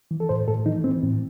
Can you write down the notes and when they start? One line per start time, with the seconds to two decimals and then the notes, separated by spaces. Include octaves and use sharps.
0.11 E3
0.20 A4
0.29 A2 C5
0.48 A2 A4
0.66 E3 D#4
0.84 E3 C4
1.03 A2 C4